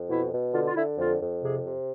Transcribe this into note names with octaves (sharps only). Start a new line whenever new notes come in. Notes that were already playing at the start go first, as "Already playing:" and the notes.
Already playing: F2
B2 E4
B2
D3 F4
F4
D3 E4
F2 F4
F2
C3 G#4
C3